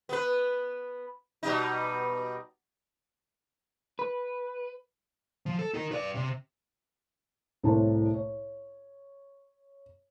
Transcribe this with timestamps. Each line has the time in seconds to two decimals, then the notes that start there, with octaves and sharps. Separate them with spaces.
0.09 B3 B4
1.43 B2 G3 D#4
3.99 B4
5.46 F3
5.59 A4
5.74 D#4 A#4
5.92 B4 D5
6.15 C3
7.63 C2 A2 E4 C5 C#5 A5
8.14 C#5